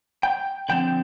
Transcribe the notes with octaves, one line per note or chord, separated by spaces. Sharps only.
G5
D3 F3 A3 C4 G5